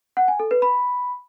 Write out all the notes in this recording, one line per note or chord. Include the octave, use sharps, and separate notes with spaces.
F#5
G#5
A4
B4
B5